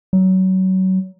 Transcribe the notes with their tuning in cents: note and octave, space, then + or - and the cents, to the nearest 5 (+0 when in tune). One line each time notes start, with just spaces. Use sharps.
F#3 +25